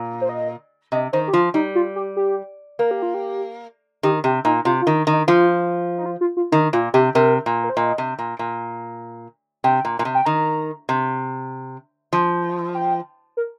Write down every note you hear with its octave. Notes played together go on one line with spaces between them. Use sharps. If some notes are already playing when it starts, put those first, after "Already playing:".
Already playing: A#2
C5
D#5
C3 D#5
D#3 C5
G4
F3 F4
G3 D#4
F4
G4
G4
A#3 A#4
G4
F4
G4
D#3 G4
C3 G4
A#2 D#4
C3 F4
F4
D#3
D#3
D#4
F3 F4
D#4
F4
F4
F4
D#3 D#4
A#2 F4
C3 G4
C3 A#4
A#2
A#4
C5
A#2 D#5
C3
A#2
A#2
C3 G5
A#2
A#2
C3
G5
D#3 A#5
C3
F3
G5
A#4